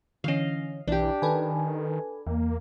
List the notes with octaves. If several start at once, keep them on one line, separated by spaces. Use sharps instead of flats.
D3 E3 C#4 D#5 F5
B1 E3 D4 G4
D#3 A4 B4 G#5
E2 A#3